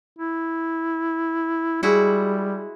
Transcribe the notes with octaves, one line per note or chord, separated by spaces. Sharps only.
E4
G3 G#3 E4 F#4